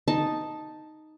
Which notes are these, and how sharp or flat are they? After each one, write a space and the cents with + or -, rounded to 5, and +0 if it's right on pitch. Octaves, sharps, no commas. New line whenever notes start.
D#4 +0 A5 +0